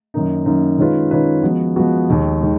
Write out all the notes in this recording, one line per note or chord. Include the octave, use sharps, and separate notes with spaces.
F#2 D#3 A#3 D#4
F#2 D#3 A#3 D#4
D#3 G#3 C#4 F4 B4
D#3 G#3 C#4 F4 B4
F3 G#3 B3 F#4
F3 G#3 B3 F#4
D#2 D#3 G#3
D#3 G#3